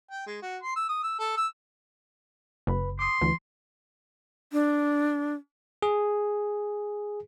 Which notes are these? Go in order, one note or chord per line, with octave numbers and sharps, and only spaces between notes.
G5
G#3
F#4
C6
E6
D#6
E6
A4
E6
F#1 B4 B5
C6 D6 D#6
D2 E3
D4
G#4